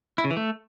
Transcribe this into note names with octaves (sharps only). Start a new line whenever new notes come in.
E4
C#3
E3
A3